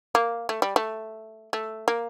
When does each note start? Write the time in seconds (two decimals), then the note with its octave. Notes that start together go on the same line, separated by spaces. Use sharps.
0.15 A#3
0.49 A3
0.62 G3
0.76 A3
1.53 A3
1.88 A#3